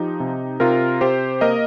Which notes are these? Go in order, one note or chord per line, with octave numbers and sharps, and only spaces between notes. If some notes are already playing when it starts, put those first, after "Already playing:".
Already playing: F3 D#4 G4
C3
C3 F4 A#4
C3 G4 C5
A#3 A#4 D#5